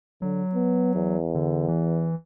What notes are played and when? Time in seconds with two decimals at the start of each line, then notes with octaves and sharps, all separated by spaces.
0.22 D3 F#3
0.54 B3
0.95 E2
1.35 D3
1.68 E3